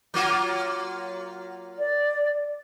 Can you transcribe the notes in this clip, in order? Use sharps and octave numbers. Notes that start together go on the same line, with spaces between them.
F#3 A#3 F4
D5